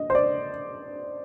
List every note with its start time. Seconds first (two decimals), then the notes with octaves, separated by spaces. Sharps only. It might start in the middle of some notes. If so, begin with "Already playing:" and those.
Already playing: D#5
0.10 C5
0.15 D5